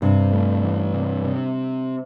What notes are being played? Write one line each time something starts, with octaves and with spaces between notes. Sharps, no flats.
G2 C3
A3
E3
C3
C3